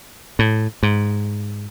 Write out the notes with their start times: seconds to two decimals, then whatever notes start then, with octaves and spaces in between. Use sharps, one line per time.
0.39 A2
0.83 G#2